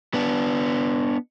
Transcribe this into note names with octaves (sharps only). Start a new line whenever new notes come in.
B3 D4